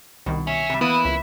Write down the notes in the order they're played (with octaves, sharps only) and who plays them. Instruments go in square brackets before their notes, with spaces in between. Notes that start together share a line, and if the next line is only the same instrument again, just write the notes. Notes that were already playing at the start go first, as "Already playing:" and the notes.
[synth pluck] C2 D#3 [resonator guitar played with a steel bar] B2
[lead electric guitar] C#4 [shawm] E5
[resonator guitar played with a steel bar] C3 G3
[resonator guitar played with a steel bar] E3 A#3 B4 [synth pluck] B3 [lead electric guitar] E4 [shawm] D#6
[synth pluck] C#2 [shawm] E5